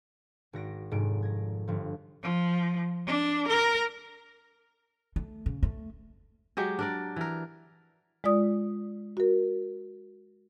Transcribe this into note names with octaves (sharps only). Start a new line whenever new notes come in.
G#1 F#4 A#6 D7
F1 G#2 G#4 D7
G#6 A#6
G1 F3
F3
D4
A#4
A3
C#3
A3
F#3 G#3 G4
D4 A#4 D5
E3 A#4
G#3 F4 D5 D#6
F#4 A#4